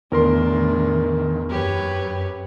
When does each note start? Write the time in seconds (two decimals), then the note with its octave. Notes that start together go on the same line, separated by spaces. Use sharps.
0.12 E2 A2 D#3 D4 A#4 C6
1.49 F#2 G4 B4 C#5